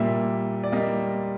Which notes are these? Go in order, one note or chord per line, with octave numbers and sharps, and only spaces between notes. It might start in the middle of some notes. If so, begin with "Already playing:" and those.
Already playing: A#2 G3 A#3 E5
D5
G3 A#3 D#5